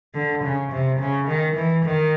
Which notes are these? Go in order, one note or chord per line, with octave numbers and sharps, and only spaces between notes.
D3
C#3
C3
C#3
D#3
E3
D#3